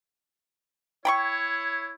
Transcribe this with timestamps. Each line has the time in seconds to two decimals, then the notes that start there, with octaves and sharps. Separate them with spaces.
1.05 E4 C#5 G5 B5 C#6